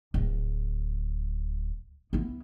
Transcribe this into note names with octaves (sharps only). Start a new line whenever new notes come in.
D1
B3 E4